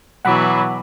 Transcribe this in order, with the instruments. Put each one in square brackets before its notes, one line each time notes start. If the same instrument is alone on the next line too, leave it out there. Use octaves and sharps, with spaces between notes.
[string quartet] B2 E3 F#3 [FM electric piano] F#5 B5 D6